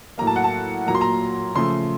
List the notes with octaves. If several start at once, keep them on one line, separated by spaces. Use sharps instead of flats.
A2 F#3 A#3 A#5
A5
F#5
A5
A#2 F#3 A#3 A#5
C6
A#5
C#3 F3 A3 C6